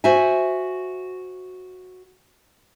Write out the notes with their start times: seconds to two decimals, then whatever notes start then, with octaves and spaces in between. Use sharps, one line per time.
0.04 F#4 C5 E5 G#5